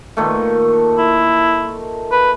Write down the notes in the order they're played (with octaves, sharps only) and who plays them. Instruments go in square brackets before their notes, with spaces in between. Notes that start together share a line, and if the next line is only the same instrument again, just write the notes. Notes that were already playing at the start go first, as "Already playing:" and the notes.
[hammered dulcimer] A#2 D#3 A3
[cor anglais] E4
B4